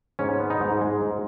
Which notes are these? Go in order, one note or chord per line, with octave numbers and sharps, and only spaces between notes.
G#2 C#4
B3
D#4
G#2
G#3
G#2